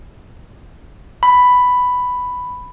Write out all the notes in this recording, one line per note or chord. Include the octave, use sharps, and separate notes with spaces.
B5